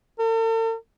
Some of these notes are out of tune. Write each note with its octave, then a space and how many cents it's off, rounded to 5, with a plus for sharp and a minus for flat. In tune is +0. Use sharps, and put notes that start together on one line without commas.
A4 +45